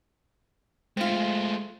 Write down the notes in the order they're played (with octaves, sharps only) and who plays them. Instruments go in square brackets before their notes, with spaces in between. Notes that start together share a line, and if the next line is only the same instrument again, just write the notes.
[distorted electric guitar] G#3 A3 [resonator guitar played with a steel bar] C4 F4